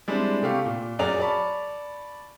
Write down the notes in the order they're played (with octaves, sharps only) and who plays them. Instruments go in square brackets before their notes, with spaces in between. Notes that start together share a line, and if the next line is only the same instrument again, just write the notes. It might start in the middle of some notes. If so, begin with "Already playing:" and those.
[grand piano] G3 G#3 C4 D4 E4
C3 A3 G4 F5 C#6
A#2
F#2 G#4 D5 A#5 F7
D5 A5 B5 C#6